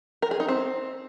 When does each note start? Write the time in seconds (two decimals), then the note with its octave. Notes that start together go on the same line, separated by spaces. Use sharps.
0.22 A#4
0.31 G#4
0.40 D#4
0.48 C4